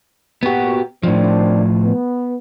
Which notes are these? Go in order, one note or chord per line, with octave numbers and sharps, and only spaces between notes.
A#2 B3 F#4 G4
A2 D#3 F3 C4 D4
B3